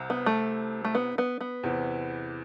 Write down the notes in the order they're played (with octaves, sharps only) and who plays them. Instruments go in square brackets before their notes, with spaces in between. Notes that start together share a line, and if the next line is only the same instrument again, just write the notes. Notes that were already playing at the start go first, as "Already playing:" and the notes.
Already playing: [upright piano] C2 C3
[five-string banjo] B3
A3
A3
B3
B3
B3
[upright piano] E2 C3 E3